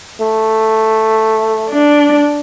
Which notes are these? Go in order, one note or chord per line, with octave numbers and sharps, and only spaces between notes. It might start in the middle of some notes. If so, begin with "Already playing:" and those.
A3
D4